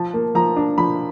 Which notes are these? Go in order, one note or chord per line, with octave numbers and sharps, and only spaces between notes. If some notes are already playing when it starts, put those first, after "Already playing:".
Already playing: F3 A5
A#3
F3 A#5
D4
F3 B5